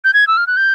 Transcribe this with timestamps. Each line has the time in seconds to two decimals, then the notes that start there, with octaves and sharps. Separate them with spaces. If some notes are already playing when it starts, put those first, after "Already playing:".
0.04 G6
0.14 G#6
0.27 E6
0.37 F6
0.47 F#6
0.57 G6